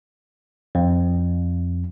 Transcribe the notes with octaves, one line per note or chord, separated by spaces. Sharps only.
F2